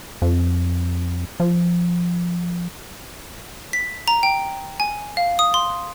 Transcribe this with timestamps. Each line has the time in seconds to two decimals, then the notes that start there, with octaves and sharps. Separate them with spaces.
0.22 F2
1.40 F3
3.73 B6
4.08 A#5
4.23 G5
4.80 G#5
5.17 F5
5.39 D#6
5.54 C6